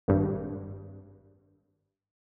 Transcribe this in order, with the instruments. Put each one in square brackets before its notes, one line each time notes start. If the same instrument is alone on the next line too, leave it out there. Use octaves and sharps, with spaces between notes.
[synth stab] G#1 G2